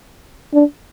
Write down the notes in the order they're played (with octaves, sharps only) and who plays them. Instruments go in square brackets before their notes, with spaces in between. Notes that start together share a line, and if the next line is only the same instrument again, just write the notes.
[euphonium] D4